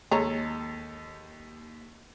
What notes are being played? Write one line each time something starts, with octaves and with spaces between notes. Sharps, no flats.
D#2 G#3 A4 C#5 A#5